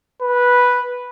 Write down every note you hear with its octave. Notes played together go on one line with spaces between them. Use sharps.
B4